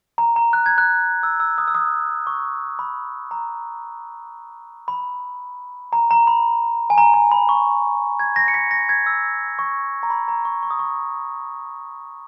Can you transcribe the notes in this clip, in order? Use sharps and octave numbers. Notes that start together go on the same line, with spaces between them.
A#5
A#5
F#6
G#6
F#6
E6
E6
D#6
E6
D#6
C#6
B5
A#5
B5
A#5
A#5
B5
G#5
A#5
A#5
B5
C#6
G#6
A#6
C#7
B6
A#6
G#6
E6
C#6
A#5
B5
A#5
C#6
C#6
D#6
C#6